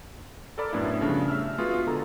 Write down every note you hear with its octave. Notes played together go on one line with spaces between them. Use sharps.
A4 A#4 D5 B5
F#2 A2 B3 D4 E4
C#3 F3 G3 A3 D4
E5 E6 F6
G#3 B3 F4 F#4 G#4
D3 A4 A#5